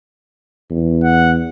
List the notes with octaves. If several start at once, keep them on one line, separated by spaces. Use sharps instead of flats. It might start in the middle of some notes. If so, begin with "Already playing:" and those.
E2
F#5